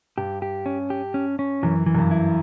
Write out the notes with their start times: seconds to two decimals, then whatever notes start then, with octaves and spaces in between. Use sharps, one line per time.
0.18 G2 G4
0.42 G4
0.66 C#4
0.90 G4
1.14 C#4
1.39 C#4
1.63 F#2 E3
1.86 E3
1.95 F#2
1.99 G2
2.11 E4